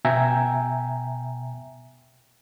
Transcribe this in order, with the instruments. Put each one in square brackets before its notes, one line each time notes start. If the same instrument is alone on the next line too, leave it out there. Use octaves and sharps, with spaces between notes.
[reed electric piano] B2 E5 G5 G#5 A#5